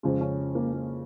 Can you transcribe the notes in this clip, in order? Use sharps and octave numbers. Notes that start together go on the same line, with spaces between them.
F2 C#3 G#3 F4
C#4
A#3
A#3